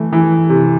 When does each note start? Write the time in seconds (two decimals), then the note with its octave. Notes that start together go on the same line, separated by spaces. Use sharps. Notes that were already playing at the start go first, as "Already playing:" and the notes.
Already playing: E3 A3
0.13 E3
0.49 C3